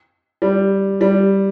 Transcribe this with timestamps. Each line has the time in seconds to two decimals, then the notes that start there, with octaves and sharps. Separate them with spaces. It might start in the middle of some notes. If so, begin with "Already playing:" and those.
0.42 G3
1.01 G3